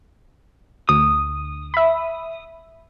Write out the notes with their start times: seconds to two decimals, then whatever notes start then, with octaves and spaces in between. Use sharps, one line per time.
0.89 D2 D#6
1.74 E5 B5